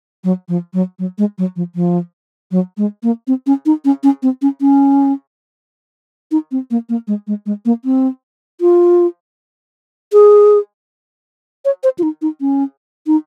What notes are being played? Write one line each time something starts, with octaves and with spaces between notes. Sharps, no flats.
F#3
F3
F#3
F#3
G#3
F#3
F3
F3
F#3
G#3
A#3
C4
C#4
D#4
C#4
C#4
C4
C#4
C#4
D#4
C4
A#3
A#3
G#3
G#3
G#3
A#3
C4
F4
G#4
C#5
C5
F4
D#4
D#4
C#4
D#4